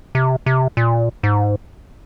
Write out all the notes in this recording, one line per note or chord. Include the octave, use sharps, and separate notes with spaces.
C3
C3
A#2
G#2